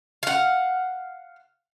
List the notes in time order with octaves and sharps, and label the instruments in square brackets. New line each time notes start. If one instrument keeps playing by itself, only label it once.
[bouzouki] F5 F#5